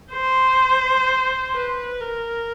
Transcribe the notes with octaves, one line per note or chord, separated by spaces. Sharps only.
C5
B4
A#4